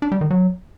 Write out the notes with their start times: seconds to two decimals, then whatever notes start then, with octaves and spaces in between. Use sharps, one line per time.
0.02 D4
0.12 G3
0.21 D#3
0.31 F#3